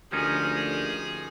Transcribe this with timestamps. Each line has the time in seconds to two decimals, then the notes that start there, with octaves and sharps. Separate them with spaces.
0.12 D2 F3 A#3 C#4 D#4 G4 G#4